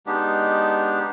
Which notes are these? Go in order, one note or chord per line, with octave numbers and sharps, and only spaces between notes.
G#3 B3 D4 D#4 G4